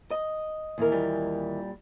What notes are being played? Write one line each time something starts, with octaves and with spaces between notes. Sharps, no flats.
D#5
D#2 E3 A#4
A#2 G3